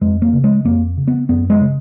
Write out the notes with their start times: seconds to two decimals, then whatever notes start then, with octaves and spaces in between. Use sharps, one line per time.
0.01 F2 G#3
0.22 A#3
0.33 C#3
0.44 G#3
0.65 F2 A#3
0.97 C#3
1.08 B3
1.29 F#2 B3
1.50 G#3
1.61 C#3